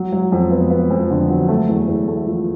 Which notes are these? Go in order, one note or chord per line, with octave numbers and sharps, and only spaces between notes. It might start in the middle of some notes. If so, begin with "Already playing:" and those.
Already playing: F#3
F#3
F2
B3
B3
F2
D3
F#3
A3
E2
E2
A3
F3